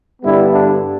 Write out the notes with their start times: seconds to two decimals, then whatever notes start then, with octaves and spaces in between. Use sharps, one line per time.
0.22 G2 D3 G3 B3 E4
0.51 D4